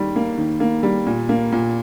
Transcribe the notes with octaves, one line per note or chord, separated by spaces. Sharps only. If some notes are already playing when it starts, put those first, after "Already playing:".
Already playing: D#2 D#3 G3
A#3
D#3
A#3
G3
A#2
A#3
A#2